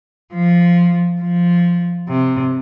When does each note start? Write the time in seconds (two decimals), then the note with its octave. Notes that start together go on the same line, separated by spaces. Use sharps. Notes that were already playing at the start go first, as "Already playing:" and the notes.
0.34 F3
1.22 F3
2.09 C3